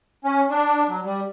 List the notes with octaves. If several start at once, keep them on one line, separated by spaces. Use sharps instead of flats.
C#4
D4
F#3
G3